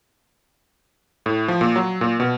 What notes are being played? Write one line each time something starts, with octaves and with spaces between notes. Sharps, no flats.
A2
F3
A#2
F#3
A#2
B2